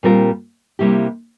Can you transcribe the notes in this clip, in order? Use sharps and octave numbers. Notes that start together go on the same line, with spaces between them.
A#2 G3 C4 F4 A#4
C3 G3 A#3 E4 G4